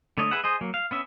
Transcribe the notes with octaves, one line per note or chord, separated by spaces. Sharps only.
D3 A3 C#5 D#5
G#4 B4 E5 F#5
G#4 C5 D#5
F#3 A#3
F5
B3 C#4 E5